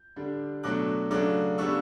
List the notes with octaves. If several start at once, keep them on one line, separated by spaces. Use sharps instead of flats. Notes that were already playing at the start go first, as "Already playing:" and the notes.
Already playing: G6
D3 G3 D4
B2 F#3 A3 D4 D6 F#6
C#3 F#3 A3 D4 D6 F#6
C#3 G3 B3 D4 C#6 E6